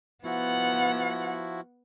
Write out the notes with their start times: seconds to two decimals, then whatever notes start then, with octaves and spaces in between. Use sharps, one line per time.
0.24 F3 B3 E4 F#4 F#5